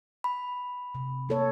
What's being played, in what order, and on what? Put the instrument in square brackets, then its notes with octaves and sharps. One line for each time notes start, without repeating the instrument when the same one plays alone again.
[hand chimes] B5
[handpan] C3
A#3 A4 C#5